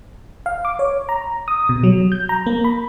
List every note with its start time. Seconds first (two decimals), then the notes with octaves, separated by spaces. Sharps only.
0.46 F5
0.65 D6
0.79 C#5
1.09 A#5
1.48 D#6
1.69 B2
1.83 F#3
2.12 G6
2.29 A#5
2.46 A#3
2.64 B5